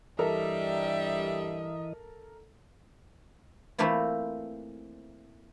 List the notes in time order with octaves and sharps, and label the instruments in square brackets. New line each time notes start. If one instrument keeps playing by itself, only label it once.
[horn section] G2 G3 [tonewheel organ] E3 D#5 [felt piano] A4 A#4 [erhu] E5
[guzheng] E3 A3 A#3 C4 E4 F4